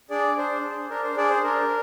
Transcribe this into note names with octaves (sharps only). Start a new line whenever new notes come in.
D4 G#4 D5
D4 C5
G#4
D4 A#4
C5
D4 G#4 D5
C5
D4 A#4